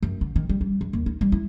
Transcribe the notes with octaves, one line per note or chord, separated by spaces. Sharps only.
F#2
D3
D#3
G3
G3
F#2
D#2
D#4
G3
E4